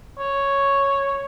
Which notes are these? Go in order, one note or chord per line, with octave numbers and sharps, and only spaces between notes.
C#5